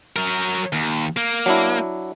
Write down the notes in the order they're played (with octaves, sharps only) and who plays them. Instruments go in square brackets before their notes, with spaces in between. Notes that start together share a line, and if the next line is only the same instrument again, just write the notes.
[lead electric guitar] F#3 A#4
D#2
A#3
[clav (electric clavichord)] F#3 D4 E4